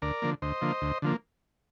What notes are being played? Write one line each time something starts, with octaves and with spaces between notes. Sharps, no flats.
D2 A#4 D5
D3 F3 A#3
D2 C5 D#5
D3 F3 A#3
D2
D3 F3 A#3